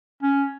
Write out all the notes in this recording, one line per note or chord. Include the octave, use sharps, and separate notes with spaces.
C#4